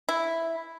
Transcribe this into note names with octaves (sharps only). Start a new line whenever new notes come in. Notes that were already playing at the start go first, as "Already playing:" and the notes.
E4